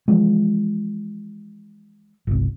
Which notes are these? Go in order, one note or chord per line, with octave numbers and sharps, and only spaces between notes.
E3 F3 G#3
G1 C2